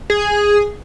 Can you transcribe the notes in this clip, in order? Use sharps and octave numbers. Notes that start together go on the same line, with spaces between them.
G#4